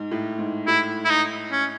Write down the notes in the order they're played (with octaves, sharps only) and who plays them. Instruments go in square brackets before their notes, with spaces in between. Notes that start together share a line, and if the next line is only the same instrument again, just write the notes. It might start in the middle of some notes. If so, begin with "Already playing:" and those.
Already playing: [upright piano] G#2
A2
G#2
[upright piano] A2 [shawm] E4
[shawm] E4
D#4
C#4